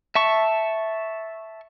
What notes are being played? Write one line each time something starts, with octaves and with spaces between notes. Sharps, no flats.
E5 A5 C#6